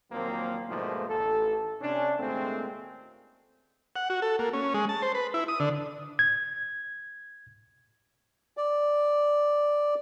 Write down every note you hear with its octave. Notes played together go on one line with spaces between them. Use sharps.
D#2 A#2 F3 F#3 A#3 C4
G#2 B2 D3 F3 A3 A#3
A1 A4
C3 C#4 D4
D#2 A#2 G#3 A3 C4
F#5
F#4
A4
A#3
C#4
G#3
A5
C5
B4
E4
D#6
D3
G#6
D5